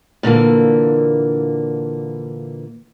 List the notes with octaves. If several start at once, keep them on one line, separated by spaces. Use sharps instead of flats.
A#2 D3 E3 A#3